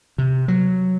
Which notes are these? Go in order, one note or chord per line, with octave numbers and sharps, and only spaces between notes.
C3
F#3